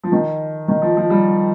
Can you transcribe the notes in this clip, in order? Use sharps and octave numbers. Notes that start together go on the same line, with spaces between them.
F3
D#3
D#3
F3
F3
G3